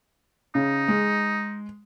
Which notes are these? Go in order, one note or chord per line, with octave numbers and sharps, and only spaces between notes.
C#3 D#4
G#3